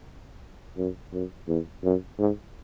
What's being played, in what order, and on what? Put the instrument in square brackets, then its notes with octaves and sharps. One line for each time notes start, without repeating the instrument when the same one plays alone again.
[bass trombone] F#2
F#2
E2
F#2
G#2